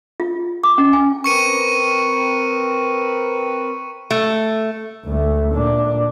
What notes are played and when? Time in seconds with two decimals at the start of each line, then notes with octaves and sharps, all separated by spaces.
0.20 F4
0.63 D6
0.78 C#4
0.93 G#5
1.24 C4 A#4 B4 C#6 C#7 D#7
4.11 A3
5.05 D2 A3
5.53 A#2 D4